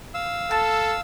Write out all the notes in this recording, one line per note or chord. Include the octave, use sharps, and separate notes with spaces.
F5 E6
A4 A5